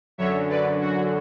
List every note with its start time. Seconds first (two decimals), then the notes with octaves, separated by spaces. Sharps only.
0.18 F#2 D3 F#3 C#5 E5
0.49 B4 D5
0.81 F#4